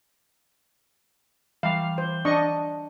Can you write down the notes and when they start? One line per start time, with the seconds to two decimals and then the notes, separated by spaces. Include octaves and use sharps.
1.63 E3 G3 F5
1.98 C5
2.25 D4 D#5 C#6